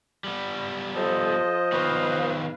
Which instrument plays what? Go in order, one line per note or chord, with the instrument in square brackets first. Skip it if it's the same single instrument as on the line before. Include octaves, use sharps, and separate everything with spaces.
[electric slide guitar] G3 B3
[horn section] F3 C5 D#5 [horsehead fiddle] A4
[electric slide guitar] D#3 B3 C#5 [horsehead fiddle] B4 F5